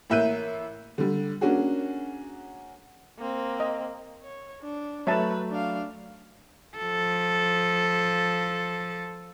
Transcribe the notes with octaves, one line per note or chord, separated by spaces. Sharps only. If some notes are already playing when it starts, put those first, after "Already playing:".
A1 A#3 E5 F#6 G6 D#7
D3 G3
A#3 C#4 D4 F#4 G#4
A#3 C4
D#5
C#5
D4
F#3 A3 B4 C#5 E5 A5
D4 F5
F3 A4